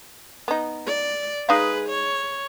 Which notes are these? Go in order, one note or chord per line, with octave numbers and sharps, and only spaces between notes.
B3 D#4
D5
G#3 D#4 G#4 B4 F5
C#5